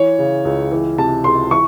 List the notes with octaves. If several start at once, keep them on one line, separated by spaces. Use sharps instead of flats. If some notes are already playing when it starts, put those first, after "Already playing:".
Already playing: E3 C#5
C#3
C#2
E3
C3 A5
C#2 C6
E3 C#6